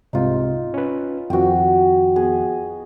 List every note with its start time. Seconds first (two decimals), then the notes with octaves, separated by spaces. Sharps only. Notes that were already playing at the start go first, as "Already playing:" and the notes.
0.13 C2 G#2 C3 D#4 F4
0.74 C#4 B4
1.30 F2 D#3 F3 F#4 G5
2.16 B3 G#4